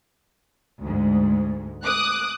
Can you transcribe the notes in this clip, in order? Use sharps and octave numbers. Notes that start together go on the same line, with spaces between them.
D2 G#2
D6 D#6 F#6